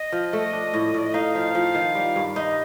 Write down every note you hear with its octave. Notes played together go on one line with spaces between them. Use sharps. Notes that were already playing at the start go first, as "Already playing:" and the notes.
Already playing: D#5
F3
A3
D4
A2
A2 D5
D#5
D#4 F5
F3
F3
D#3
G3
G2
D#4 D#5 F5